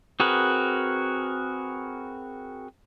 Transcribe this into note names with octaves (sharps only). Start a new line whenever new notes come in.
C4 F#4 G#4 A#4 B4